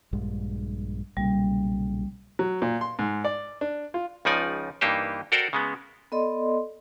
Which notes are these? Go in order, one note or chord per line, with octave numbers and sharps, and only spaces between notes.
A#1 G2 G#3
B1 A#2 C#3 G3
F#3
A#2
C6
G#2
D5
D4
F4
C#2 C#3 F3 D#4 D5 G#5
G2 E3 A#3 D#4 G4 C5
F#4 A4 A#4 C5 D5 G5
C#3 G#3 B3
B3 A4 D5 D#5 C6